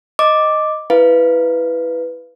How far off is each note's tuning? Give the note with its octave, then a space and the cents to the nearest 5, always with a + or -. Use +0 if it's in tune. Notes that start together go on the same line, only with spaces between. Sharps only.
D#5 +0 D6 +0
E4 +0 B4 +0 F5 -25